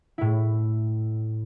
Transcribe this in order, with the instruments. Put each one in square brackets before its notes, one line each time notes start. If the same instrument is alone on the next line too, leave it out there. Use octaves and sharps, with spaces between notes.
[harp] A2 E4